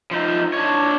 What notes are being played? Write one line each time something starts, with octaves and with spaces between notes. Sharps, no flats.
F3 D#4
D4 C#5